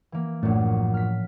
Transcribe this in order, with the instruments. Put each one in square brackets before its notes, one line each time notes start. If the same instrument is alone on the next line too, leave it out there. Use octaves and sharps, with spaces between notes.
[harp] E3 A#3
[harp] A#1 F#2 [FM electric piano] A2
[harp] F6 B6